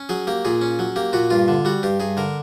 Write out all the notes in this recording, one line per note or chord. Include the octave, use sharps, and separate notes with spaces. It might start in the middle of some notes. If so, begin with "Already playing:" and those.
Already playing: C#4
F#3 G#4
A#3 G4
A#2 G#4
C#4
F#3
A#3 G4
A#2 F#4
G2 F4
D3
G3 F#4
G2 G4
G2 G#4
D3 A#4